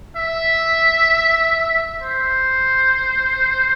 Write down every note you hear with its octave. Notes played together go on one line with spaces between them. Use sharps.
E5
C5